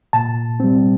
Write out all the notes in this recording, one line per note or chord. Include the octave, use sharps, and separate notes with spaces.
A#2 A5
G3 C4